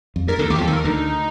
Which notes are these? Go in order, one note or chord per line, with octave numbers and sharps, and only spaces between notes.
F2
G2 A#4
D2 D3 A4
D#2 D#3 G4
F2 F3
A4
D#2 D#3
A#4
D2 D3 D#4